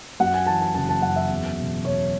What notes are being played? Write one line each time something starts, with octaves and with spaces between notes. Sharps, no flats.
F#2 F#5
G#5
E3 A5
A5
F#1 A5
A5
F#2 F#5
E5
E2
E1
E1 C#5